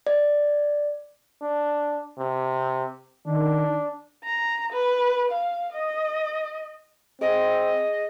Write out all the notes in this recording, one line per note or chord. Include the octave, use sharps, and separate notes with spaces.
D5
D4
C3
D#3 D4
A#5
B4
F5
D#5
C4 G#4 D#5